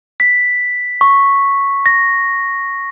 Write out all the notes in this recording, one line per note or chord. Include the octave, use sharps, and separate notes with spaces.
B6
C#6
A#6